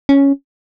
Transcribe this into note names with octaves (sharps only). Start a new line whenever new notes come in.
C#4